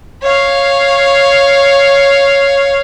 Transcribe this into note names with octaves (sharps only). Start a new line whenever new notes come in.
C#5 F5